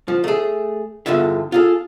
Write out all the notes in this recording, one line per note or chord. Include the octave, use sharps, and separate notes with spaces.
F3
A3 G#4
E2 G2 D3 F4 E5
F4 G#4 A4